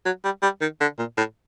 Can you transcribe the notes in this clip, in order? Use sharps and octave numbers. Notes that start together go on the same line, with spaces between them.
F#3
G3
G3
D#3
D3
A#2
A2